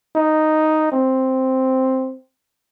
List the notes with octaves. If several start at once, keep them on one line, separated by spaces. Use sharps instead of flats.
D#4
C4